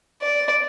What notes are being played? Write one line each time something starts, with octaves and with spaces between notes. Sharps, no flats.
D5